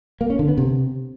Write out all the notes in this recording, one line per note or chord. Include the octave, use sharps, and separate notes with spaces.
A#3
C#4
D3
B3
C3